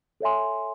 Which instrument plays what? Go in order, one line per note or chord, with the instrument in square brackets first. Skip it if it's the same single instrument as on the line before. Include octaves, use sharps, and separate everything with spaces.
[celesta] A4 C#5 E5 G#5 C6